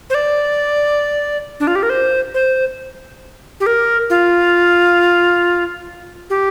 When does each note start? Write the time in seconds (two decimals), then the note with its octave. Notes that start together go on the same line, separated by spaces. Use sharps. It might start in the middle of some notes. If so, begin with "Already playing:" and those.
0.10 C5
0.14 D5
1.60 D4
1.67 F4
1.75 G4
1.83 A#4
1.90 C5
2.34 C5
3.60 G4
3.66 A#4
4.10 F4
6.30 G4